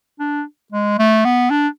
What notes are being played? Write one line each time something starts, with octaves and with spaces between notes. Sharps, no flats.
D4
G#3
A3
B3
D4